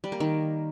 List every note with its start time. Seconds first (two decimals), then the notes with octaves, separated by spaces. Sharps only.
0.04 G3
0.12 A#3
0.20 D#3